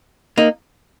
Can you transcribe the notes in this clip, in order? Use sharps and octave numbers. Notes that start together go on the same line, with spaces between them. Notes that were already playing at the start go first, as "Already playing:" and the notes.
A#3 D#4